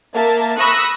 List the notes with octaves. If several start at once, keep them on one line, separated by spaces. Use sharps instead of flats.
A#3 E5 A5
B5 C#6 D#6 E6 F#6 A#6